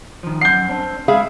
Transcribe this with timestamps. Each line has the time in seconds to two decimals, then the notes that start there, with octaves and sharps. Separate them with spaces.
0.23 D#3 F3
0.41 F#2 F#5 G6 C7
0.69 C4 D4
1.08 G#3 E4 G#4 E5 F5